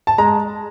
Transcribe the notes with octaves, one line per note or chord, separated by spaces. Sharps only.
A5
G#3 A#5